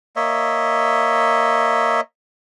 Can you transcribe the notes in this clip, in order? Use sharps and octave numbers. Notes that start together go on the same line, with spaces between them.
A#3 C#5 D#5 E5